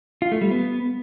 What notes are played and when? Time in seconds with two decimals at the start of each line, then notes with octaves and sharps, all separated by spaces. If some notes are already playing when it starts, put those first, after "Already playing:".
0.22 F4
0.32 A3
0.41 G3
0.51 B3